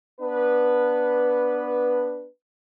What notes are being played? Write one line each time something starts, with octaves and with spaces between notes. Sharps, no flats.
B3 D4 B4